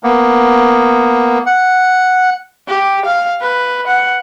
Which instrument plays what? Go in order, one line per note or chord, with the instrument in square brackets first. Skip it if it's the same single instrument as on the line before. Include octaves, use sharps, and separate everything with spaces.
[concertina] A#3 B3
F#5
[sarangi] G4
F5
B4
F#5